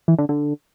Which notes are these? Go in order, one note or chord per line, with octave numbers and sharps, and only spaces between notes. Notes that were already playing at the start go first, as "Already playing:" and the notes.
E3
D3
D3